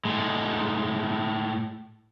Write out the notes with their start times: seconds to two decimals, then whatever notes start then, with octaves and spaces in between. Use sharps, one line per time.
0.05 A2 G#3